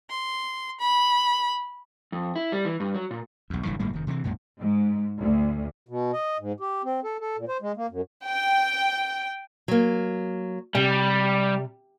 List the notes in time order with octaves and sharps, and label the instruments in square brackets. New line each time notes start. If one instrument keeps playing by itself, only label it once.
[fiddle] C6
B5
[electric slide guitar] F2
E4
G3
E3
G2
F#3
A#2
[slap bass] B1 E2
F#1 G2 A#2 E3
G1 A2 G3 A#3
F1 D#3
C3 E3 A3 C4
B1 F#2 A#2 G#3
[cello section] G#2
D2
[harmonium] B2
D#5
G#2
G4
C4
A4
A4
A#2
C5
G#3
A#3
F#2
[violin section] G5
[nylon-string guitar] F#3 A#3
[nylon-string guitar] C3 [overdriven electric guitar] G3